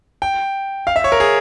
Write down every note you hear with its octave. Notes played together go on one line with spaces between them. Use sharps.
G5
F5
E5
C#5
A#4
G#4